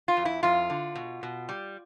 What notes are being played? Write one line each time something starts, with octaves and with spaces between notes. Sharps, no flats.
F4
F2
E4
F2 F4
D3
B2
B2
G3